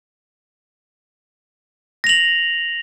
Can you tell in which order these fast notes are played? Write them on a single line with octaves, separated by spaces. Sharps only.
A#6 F7 F#7